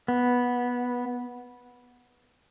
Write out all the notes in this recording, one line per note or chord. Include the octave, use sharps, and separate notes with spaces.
B3